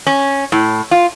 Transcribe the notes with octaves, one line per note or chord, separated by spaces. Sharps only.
C#4
A2
F4